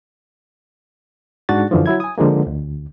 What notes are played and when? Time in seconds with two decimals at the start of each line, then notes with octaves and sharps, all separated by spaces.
1.49 G#2 D4 F#4 A6
1.71 F#2 D3 E3 F3
1.86 F#3 E4 G#6
2.00 G#5 D#6
2.18 D3 F3 G#3 A#3
2.47 D2